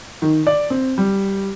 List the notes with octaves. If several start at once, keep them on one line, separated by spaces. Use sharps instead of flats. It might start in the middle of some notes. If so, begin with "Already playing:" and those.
D#3
D5
C4
G3